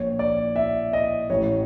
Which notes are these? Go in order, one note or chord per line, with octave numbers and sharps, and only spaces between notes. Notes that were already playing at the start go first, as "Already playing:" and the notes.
Already playing: A#1 A#2 C#5
D5
E5
D#5
A1 A2 E3 C#5